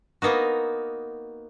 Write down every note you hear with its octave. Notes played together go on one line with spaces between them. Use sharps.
A#3 B3 D#4 F#4